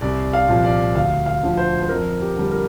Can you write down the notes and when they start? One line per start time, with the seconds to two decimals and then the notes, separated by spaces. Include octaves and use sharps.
0.01 C2 D5
0.33 F5
0.48 A#2 F3
0.64 D5
0.95 D2 F5
1.26 F5
1.43 D3 F3
1.57 C5
1.82 C5
1.89 F2 A#4
2.21 G4
2.36 D3 G3
2.51 A#4